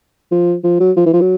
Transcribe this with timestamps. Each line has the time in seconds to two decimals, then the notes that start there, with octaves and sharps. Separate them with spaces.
0.32 F3
0.64 F3
0.80 F#3
0.97 F3
1.06 E3
1.13 F3
1.21 F#3